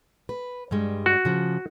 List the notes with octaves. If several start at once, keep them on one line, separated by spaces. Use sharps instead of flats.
B4
G2 G3 G#3
F#4
C#3 F3